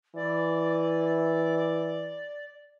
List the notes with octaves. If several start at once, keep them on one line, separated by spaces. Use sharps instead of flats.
E3 D5